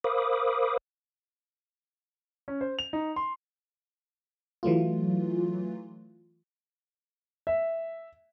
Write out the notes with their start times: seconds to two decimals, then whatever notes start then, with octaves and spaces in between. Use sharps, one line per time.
0.04 A#4 C5 F5 B5 D6 D#6
2.48 C#4
2.61 C5
2.79 F7
2.93 D#4
3.16 C6
4.63 E3 F#3 A3 F4
7.47 E5